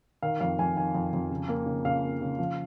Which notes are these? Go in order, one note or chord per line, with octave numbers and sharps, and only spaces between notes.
D#3 F5
F2 F5
F2 G#5
D#3 G#5
F2
F2
C#3
A#3
C#3
C#3 F5
A#3
C#3
F3